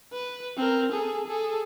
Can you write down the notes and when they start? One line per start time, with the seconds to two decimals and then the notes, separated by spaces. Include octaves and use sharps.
0.13 B4
0.57 C4 A#4
0.92 G#4 A4
1.27 G#4 A4